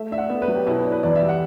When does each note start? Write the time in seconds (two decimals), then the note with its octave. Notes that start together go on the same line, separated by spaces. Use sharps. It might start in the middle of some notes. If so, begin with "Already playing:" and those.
Already playing: A3 E5
0.11 D4 E5
0.18 F#5
0.29 B3 E5
0.42 B4
0.48 F#3
0.55 G4
0.66 B2 E4
0.79 B4
0.85 D4
0.92 B4
1.03 E2 D5
1.16 E5
1.22 G3
1.29 F#5